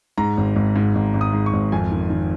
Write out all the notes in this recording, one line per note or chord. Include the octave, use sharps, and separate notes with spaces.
G#2 A#5
G#1
G#1
G#2
G#1
G#1
D#6
G#2
C#6
G#1
F2 G#5
D#3
D#3